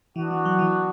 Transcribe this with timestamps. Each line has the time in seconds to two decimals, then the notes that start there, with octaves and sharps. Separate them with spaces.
0.16 E3 B3 D4 F#4
0.31 E3
0.45 F#3
0.59 E3